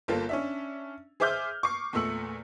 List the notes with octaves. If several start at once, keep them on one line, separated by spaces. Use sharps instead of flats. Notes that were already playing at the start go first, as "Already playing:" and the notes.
G1 A#3 F4 A4
C#4 D4 E5
G#4 C5 E5 D6 F6 G6
C#6 D6 C7
E2 A#2 A3 E6 C#7 F#7